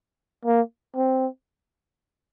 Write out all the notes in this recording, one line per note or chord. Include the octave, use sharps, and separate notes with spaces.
A#3
C4